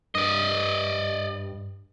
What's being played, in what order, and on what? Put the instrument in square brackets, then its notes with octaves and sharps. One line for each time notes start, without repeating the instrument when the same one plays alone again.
[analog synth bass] G2 [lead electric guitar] D5 D#5